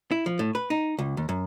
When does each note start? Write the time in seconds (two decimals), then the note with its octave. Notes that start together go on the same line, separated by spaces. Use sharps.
0.11 E4
0.26 F3
0.39 A2
0.55 B4
0.70 D#4
0.99 C#2
1.17 D#2
1.29 F#2